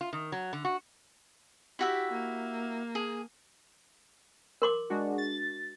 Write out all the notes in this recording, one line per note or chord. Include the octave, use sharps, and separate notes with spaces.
F4
D#3
F#3
D3
F#4
E4 F#4 G4 E5
A#3
G#4
A#4 C6 D6
G#3 D4 F#4
A6